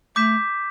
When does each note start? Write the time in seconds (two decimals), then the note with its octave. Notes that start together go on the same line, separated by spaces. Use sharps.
0.16 A3 D6 G6 B6 E7